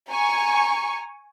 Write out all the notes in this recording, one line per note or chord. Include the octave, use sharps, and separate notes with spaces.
G#5 A#5 C#6